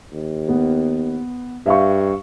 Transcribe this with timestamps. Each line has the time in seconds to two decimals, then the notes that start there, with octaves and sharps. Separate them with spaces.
0.12 D#2
0.49 B3
1.66 G2 E5 F5 C#6